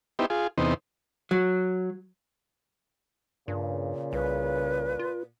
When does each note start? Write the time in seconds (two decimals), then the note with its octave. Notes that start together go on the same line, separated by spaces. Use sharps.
0.19 B3 D#4 E4 G4 C5
0.30 F4 G#4
0.58 E2 C3 B3 D#4 C5
1.31 F#3
3.48 G2 A#2 C#3
4.13 C2 B4
4.99 F4